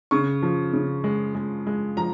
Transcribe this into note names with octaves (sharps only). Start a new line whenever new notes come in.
C#3 C#6
F3
C#3
G#3
G#3
G#3
F3 A#5